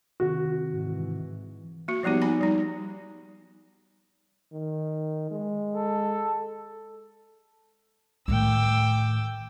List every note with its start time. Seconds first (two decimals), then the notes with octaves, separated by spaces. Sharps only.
0.20 C3 D#3 C4 F#4
0.71 G#2 E3
1.88 A#3 F#4
2.03 F3 G3 B3 D#4 G4
2.22 D#4 G#5 B5
2.41 G3 D#4
4.53 D#3
5.31 G#3
5.75 A4
8.28 A2 D#3 G5 D6 E6